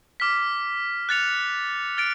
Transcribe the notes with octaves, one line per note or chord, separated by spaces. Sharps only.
D6 F6 B6
F#6 A6 C#7 F7
F6 A6 D7